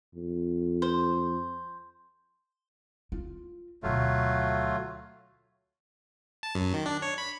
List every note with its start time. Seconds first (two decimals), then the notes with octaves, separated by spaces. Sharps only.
0.14 F2
0.82 C5
3.12 F4
3.83 D2 B2 F#3 A3 F4
6.43 A5
6.55 F#2
6.74 D#3
6.86 D4
7.02 C#5
7.18 B5